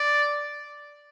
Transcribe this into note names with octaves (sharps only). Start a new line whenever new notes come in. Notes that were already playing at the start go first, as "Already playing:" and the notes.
Already playing: D5